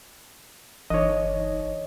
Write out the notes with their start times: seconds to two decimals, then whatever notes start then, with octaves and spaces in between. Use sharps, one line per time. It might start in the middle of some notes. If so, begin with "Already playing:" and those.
0.90 G1 E3 D#4 C#5 D#5